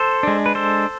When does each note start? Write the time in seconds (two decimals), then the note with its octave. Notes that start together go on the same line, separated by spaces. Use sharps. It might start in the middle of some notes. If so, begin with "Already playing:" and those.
Already playing: A4 C5
0.23 G#3 D4
0.46 B4
0.55 A4 C5